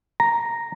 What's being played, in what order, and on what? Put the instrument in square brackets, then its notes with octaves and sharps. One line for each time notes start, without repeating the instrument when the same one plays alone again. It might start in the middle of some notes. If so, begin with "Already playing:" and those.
[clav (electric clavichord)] A#5